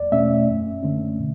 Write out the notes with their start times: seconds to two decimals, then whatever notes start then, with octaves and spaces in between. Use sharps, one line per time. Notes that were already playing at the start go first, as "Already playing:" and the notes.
Already playing: E2 D5
0.12 B2 A3 C#4 E5
0.47 F#2
0.83 D3 A3 C#4
1.18 B2